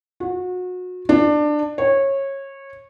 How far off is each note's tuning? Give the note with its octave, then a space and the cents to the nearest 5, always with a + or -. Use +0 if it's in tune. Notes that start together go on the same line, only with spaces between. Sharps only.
F#4 -30
D4 +20
C#5 -20